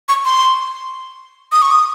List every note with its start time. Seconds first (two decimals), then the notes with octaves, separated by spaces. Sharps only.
0.09 C#6
0.25 C6
1.52 D#6
1.62 C#6
1.71 D#6